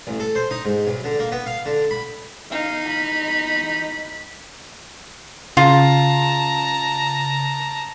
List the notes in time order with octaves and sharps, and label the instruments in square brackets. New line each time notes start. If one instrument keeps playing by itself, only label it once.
[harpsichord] A1
A4
C5
D#4
G#2
B1
D3
A#3
B3
F5
D3
B5
[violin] D#4 [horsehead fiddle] F5
[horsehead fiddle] B5
[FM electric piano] C#3 [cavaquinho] F4 [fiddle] A5 A#5